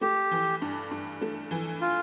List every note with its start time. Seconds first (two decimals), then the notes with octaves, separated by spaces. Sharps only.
0.01 A3 G4
0.31 E3
0.62 G2
0.91 G2
1.21 A3
1.51 E3
1.81 F4